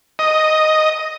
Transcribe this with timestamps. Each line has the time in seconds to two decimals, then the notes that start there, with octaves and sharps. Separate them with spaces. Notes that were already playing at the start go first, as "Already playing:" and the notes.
0.19 D#5